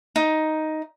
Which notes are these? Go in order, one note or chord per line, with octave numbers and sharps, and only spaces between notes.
D#4